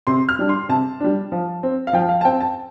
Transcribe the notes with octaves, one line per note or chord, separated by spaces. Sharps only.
C3 C6
F6
G3 D4
C6
C3 A5
G3 D4
F3
C4
F5
F3 G5
F5
A5
C4 G5
A5